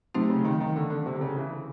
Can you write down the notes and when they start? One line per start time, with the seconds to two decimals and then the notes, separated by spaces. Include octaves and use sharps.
0.14 C3 F#3 A3 C4 D#4
0.30 C#3
0.44 D#3
0.60 D#3
0.76 D3
0.90 D3
1.06 C3
1.15 D3
1.21 C#3
1.36 E3